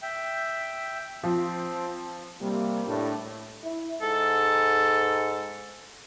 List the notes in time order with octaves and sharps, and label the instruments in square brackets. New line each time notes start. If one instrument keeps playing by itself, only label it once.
[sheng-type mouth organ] E5 G5
[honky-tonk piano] F3 [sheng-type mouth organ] C4
[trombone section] C3 G3 A#3
A2 D4
[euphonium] E4
[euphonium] G#2 [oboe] A4